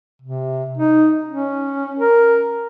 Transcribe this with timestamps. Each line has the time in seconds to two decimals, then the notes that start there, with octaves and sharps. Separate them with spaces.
0.22 C3
0.78 D#4
1.28 C#4
1.99 A#4